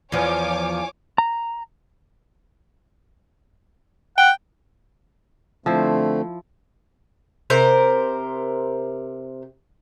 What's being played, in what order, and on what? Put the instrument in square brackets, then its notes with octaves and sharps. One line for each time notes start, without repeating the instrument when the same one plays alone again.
[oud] E2 F3 [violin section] C#5 G#5 D6
[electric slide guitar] A#5
[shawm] F#5 [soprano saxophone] G5
[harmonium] D3 A3 C4 [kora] F3 E4 C5
[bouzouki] C3 A#4 C5